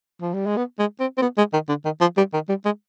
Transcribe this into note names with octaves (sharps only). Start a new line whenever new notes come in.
F3
G3
G#3
B3
G#3
C4
C4
B3
G#3
D#3
D3
D#3
F3
G3
D#3
G3
G#3